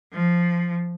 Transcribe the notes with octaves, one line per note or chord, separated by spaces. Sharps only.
F3